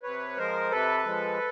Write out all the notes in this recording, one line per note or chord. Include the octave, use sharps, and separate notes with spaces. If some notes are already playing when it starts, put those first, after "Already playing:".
C3 B4 C#5
F3 G#3 A#4 C5
C3 A4 B4
F3 G#3